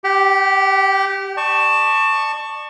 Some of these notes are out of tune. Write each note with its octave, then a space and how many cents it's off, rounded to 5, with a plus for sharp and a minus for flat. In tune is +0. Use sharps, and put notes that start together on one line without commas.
G4 +0 G5 -45
D5 +35 A5 +0 C#6 +0